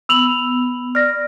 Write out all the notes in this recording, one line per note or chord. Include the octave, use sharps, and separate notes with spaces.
B3 E6 F7 F#7
D5 F6 A#6